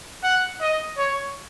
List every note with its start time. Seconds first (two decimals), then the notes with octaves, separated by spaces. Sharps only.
0.23 F#5
0.61 D#5
0.98 C#5